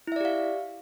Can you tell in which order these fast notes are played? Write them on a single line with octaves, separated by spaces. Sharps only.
E4 E5 D5 G4 F5